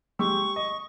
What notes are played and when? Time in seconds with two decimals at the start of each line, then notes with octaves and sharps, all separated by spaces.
0.19 G#3 G4 C#6 E6
0.56 D#5